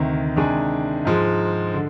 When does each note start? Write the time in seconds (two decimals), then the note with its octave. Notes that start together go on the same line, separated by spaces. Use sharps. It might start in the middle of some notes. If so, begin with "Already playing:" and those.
Already playing: D2 C3 D#3
0.36 C3 D#3 G#3 D4 G#4
1.05 G#2 F3 G#3
1.74 D3